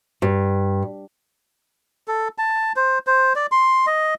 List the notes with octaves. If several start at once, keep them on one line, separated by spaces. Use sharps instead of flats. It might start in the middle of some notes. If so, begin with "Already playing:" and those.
G2
A4
A5
C5
C5
D5
C6
D#5